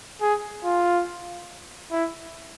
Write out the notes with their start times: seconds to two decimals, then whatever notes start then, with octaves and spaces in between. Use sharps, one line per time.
0.21 G#4
0.64 F4
1.92 E4